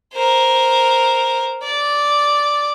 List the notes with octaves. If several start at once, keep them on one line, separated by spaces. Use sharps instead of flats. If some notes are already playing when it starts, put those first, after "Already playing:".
A#4 C5
D5